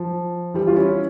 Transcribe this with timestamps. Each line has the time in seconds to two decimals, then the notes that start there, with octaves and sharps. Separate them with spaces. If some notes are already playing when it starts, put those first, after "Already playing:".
Already playing: F3
0.54 E3 G3
0.67 F4
0.76 C#4 E4